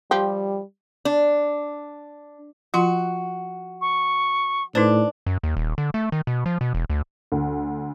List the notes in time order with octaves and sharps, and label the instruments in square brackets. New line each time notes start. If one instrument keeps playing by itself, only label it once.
[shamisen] F3 G4 [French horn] G3
[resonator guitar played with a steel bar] D4
[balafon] F3 F4 C6 [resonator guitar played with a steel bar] F#4
[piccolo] C#6
[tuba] A2 [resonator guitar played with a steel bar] D4 [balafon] D#4 B4 C5
[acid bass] F#2
D#2
D#1
D3
A3
D#3
B2
F3
B2
E1
D2
[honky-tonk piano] D2